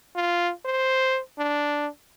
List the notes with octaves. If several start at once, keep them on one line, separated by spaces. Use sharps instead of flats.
F4
C5
D4